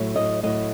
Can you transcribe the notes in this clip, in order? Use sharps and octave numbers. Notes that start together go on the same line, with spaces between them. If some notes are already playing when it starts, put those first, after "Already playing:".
Already playing: A2 F#3
D#5
A2 F#3 D#5